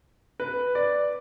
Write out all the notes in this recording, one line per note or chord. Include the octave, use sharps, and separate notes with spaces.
B4
D5